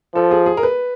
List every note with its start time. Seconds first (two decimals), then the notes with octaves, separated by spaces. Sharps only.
0.15 F3 A4
0.31 G#4
0.46 G#4
0.57 A#4
0.63 B4